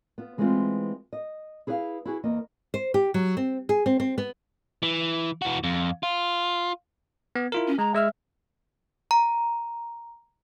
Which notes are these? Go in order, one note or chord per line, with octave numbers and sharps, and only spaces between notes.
B3 F4
E3 G#3 A3 B3 C4 F4
D#5
E4 G#4 B4 C#5 F5
E4 F#4 G#4
E2 A#3 A#4 D#5
C5
G4
F#3
C4
G#4
C4
C4
B3
E3
E3 F#4
F2
F4
B3
E4 F4 A#4
C#4
G#3 A#5
G#3 E5 E6 F6
A#5